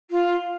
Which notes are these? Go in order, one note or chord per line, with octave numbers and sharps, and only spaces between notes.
F4